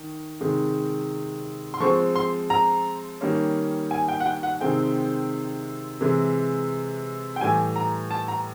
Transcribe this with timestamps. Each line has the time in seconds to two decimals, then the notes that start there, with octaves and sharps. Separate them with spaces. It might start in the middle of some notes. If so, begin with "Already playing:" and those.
Already playing: D#3
0.40 C3 D#3 G#3
1.74 C6
1.80 F3 G#3 C4 C#6
2.16 C6
2.50 A#5
3.21 D#3 G3 A#3 C#4
3.91 G#5
4.08 G5
4.20 F#5
4.26 G5
4.43 F#5
4.60 C3 D#3 G#3 C4 G5
6.01 C3 E3 G#3
7.36 G5
7.41 A2 E3 G3 G#5
7.76 A#5
8.11 A5
8.28 A#5